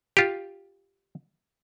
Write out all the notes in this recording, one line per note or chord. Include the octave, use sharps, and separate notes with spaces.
F4 G4